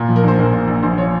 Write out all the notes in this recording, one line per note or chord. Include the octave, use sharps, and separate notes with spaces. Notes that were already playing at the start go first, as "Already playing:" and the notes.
Already playing: A#2
F3
A#4
A#1 C5
A#1 A#4
A#2
A#1
A#1 C5
F3 C#5